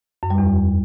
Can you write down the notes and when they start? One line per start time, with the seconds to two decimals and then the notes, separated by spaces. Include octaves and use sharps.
0.23 F#2
0.30 G3
0.38 E2